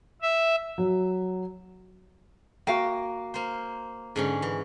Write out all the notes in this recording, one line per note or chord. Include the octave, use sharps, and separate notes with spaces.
E5
F#3
A#3 F#4 F5 G5
A#3 C5
G#2 D3 C#4
E3